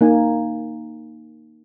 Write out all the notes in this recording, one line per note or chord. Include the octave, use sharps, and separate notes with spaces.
A#3 D#4 G#5